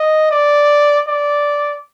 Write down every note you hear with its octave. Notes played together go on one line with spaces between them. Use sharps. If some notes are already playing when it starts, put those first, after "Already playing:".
Already playing: D#5
D5
D5